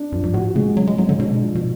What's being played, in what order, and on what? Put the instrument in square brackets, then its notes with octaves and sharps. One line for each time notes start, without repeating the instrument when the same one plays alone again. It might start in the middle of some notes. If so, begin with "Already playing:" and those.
Already playing: [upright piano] D4
[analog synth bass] F#2 [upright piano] F3
[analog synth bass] G#2
[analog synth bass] A2 [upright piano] F#4
[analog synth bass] C#3 [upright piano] G#3
[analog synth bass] F#3 [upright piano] C#4
[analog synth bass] G#3
[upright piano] G#2 [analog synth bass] F#3
[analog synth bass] D3
[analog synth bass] B2 [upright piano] D4
[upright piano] F3
[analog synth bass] B2